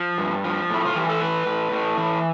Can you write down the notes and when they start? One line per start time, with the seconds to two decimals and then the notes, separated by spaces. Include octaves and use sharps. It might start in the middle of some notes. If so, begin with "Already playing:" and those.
Already playing: F3
0.18 G2
0.44 F3
0.70 A2 E4
0.85 F4
0.96 E3 G4
1.09 A4
1.20 A2 B4
1.47 A2
1.72 A2
1.98 E3